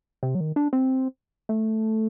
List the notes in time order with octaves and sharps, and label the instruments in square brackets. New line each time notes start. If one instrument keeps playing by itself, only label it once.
[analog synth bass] C3
F#3
D#3
D4
C4
A3